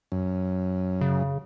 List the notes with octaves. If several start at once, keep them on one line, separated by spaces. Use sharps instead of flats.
F#2
C#3